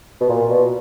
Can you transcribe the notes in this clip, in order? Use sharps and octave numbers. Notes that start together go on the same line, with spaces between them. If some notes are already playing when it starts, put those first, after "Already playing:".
B2
A#2
B2